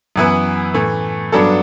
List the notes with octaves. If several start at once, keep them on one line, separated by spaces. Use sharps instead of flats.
F#2 E3 B3 E4 B4
A2 E3 A3
G2 F#3 B3 D4 A4